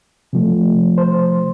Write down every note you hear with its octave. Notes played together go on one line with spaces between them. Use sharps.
C3 F3 A3
C5